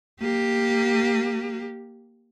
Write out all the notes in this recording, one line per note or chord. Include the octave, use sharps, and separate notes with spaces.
A#3 G4